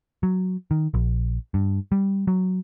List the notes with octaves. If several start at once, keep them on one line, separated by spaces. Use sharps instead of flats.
F#3
D#3
A#1
G2
G3
F#3